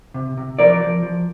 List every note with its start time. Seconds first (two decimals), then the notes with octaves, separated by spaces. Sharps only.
0.14 C3
0.37 C3
0.59 F3 A#4 D5
0.80 F3
1.03 F3